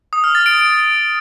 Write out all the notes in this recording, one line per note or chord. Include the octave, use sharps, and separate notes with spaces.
D#6
F6
A6
D7